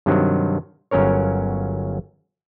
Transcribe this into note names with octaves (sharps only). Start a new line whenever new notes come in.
G2 C3 D#3 F#3
G1 F#3 C#4 A#4 C#5